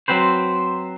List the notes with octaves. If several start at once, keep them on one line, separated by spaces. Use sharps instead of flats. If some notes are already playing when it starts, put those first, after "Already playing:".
F#3 C4 B4 C5